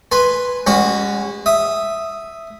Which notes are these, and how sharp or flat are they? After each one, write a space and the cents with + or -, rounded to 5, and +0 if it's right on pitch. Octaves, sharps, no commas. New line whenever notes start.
B4 +0 G#5 +0 C6 +0
G#3 -45 C#4 +0 F#4 +0
E5 +0 D#6 +0